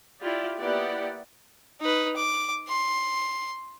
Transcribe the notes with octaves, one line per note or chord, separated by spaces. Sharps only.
E4 F4 G4 D5
A#3 B3 E4 G4 D5 F#5
D#4 B4
D6
C6